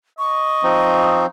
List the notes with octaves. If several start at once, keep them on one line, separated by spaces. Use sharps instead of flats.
D#5 C#6
F3 C4 D#4